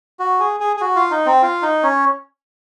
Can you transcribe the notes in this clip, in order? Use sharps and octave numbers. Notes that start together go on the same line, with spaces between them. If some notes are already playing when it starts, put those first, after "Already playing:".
F#4
G#4
G#4
G#4
F#4
F4
D#4
C4
F4
D#4
C#4